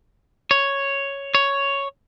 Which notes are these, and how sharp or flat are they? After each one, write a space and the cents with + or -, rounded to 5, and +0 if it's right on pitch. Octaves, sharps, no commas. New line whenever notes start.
C#5 +0
C#5 +5